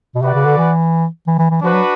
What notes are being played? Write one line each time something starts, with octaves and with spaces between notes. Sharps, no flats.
B2
C3 F#4 B4 D5 F#5
C#3
D3
E3
E3
E3
E3
F3 D4 F#4 B4
F#3